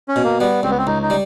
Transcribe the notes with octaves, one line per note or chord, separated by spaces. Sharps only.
C#4
B2
A#3
G3 B3
C#2 C4
B3
C4
C#2 D#4
D#4
G3